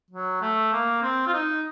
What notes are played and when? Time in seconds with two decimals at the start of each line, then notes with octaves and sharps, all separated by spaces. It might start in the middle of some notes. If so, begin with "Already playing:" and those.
0.10 F#3
0.42 A3
0.73 A#3
1.03 C4
1.27 F4
1.34 D#4